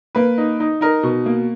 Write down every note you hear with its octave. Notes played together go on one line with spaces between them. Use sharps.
A#3 B4
D#4
D#4
D#4 A#4
B2
A#3